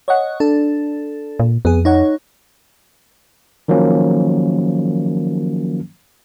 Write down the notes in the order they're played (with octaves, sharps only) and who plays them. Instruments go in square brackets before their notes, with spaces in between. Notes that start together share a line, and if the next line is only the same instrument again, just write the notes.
[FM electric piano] C#5 D#5 F#5
D4 A4
[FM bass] A#2
[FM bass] F2 [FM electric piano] B3 G#4
[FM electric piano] D#4 C#5 F#5
[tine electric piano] D#3 F3 F#3 A#3 C#4